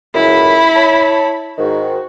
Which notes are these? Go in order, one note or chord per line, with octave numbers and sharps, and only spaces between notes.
C#2 F#2 E4 B5
C#5 A5
G#2 D#3 F#4